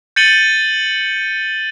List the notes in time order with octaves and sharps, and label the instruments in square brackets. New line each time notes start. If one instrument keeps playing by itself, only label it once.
[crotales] G6 A6 C#7 D#7 F#7 G7